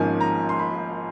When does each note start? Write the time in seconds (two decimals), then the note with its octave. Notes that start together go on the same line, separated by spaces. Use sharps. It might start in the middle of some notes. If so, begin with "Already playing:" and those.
Already playing: G#1 G#2 F3 A#3 C#4 G#5
0.20 A#5
0.49 C6
0.59 B5